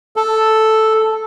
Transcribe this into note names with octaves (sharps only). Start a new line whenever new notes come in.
A4